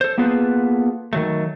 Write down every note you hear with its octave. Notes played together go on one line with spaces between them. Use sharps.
A4 C5
A#3 B3 F4 G#4 A4 B4
D#3 F#3 A3